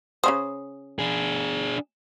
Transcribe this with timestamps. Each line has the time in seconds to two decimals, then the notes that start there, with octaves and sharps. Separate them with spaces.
0.24 C#3 C#4 C5 D#6
0.99 D4 G#4